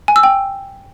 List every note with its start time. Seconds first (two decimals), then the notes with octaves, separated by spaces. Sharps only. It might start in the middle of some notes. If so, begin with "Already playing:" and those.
0.08 G#5
0.16 E6
0.23 G5